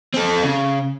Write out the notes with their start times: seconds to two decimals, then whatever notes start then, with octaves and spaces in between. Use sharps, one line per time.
0.14 C4 A4
0.44 C#3